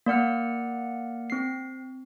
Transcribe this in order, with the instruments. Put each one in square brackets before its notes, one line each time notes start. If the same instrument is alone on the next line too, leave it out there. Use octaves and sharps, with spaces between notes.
[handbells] A#3 D5 F#5 F6
C4 C7